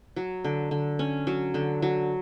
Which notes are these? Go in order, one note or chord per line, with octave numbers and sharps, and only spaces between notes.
F#3
D3
D3
C#4
F#3
D3
F#3